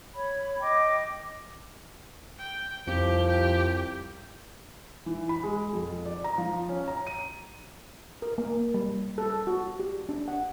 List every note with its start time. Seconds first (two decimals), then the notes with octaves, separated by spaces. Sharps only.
0.15 C#5 B5
0.61 D#5 G5 D6
2.38 G5
2.87 C2 F2 F3 G4
3.28 G4
5.06 E3
5.29 B5
5.44 G#3
5.73 F2
6.06 D5
6.24 A#5
6.38 F3
6.69 C#4
6.88 A#5
7.07 D#7
8.22 A#4
8.38 A#3
8.74 G3
9.18 A4
9.47 F#4
9.80 G4
10.09 D4
10.28 F#5